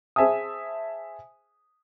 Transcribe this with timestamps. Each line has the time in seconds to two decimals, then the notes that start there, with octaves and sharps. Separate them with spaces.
0.16 G#4 C5 E5 G#5 A5 D#6